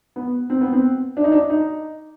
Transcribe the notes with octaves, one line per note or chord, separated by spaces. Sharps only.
B3
C4
B3
C4
D4
D#4
D4
D#4